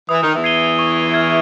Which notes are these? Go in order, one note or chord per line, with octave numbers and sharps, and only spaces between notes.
E3 D#6
D#3
E2 E3
G#6 C7 D#7 G7
C#6
F6 G#6